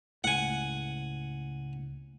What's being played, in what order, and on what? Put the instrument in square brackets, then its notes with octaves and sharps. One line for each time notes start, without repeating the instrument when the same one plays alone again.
[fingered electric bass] C#2 A2 [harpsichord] F#5 G#5